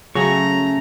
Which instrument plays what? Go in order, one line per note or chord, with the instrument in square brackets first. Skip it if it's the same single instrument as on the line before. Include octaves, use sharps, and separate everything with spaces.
[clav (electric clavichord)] C#3 G#4 [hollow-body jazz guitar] F#3 F#4 [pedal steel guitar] A3 C#4 C#6 [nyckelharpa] A#5